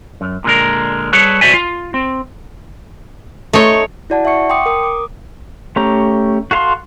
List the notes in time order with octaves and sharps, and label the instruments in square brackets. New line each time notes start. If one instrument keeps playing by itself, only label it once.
[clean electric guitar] F#2
A#2 D3 G#3 A#4
G3 G#4 A4 B4 C#5
C2 F#4 C5 D5 E5 G#5
F4
C4
[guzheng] A3 D#5 C6 [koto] D#4 C#5
[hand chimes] E4 F#4 D5 F#5 A5
E5 F#5 C#6 C#7
G5 C6 D6 D#6 C#7
A#4 D#6
D6
[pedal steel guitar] A3 C#4 G4 A#5
F#4 A4 F5 A5 C6